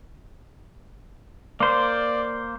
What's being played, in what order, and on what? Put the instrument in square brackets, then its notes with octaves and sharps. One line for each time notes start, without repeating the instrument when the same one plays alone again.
[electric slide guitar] A#3 C5 [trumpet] D5